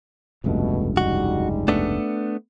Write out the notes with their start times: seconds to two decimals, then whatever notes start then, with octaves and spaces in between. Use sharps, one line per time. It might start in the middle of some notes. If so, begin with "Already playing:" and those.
0.44 F1 C#2 G2 B2 A3
0.97 G3 G#3 D#4 F#4
1.68 A3 B3 D4